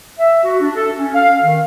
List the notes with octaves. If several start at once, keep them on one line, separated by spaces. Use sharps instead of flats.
E5
F#4
D4
A4
C#4
F5
D#3